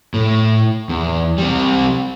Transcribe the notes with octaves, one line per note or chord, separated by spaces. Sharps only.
A2
E2
G3 C4